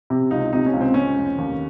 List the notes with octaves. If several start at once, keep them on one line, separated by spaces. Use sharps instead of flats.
C3
C#2 D#4
C3 D#4
C#4
C#2
C4
C#2 C#4
F1
D#2